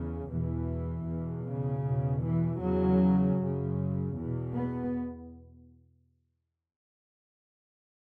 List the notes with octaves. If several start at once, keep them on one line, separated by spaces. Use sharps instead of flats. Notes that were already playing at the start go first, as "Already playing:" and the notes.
Already playing: E2 C#3
E2 B2 E3
E2 B2
C#3
E2 B2
E3
E2 C#3 F#3
F#2 C#3
E2 B2
B3